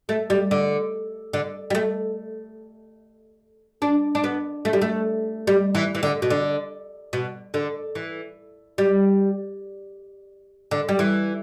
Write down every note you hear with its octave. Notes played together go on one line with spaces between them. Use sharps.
A3
G3
D3
D3
G3
A3
D4
D4
B3
A3
G3
A3
G3
E3
E3
D3
B2
D3
B2
D3
E3
G3
D3
G3
E3